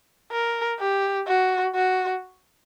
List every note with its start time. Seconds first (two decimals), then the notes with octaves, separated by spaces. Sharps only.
0.32 A#4
0.79 G4
1.27 F#4
1.75 F#4